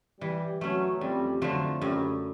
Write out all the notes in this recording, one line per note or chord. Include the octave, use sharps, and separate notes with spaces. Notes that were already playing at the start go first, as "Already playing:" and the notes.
E3 G3
F#3 A3 C#4
F2 G3
D3 F3 F#3 A3
F#2 G3